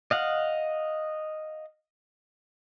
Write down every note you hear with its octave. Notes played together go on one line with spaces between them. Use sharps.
D#5 F5 F#5